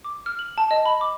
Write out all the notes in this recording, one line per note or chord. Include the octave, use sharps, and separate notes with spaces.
D6
F6
F#7
A5
D#5
B5
D6